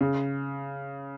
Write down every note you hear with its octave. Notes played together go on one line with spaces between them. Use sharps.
C#3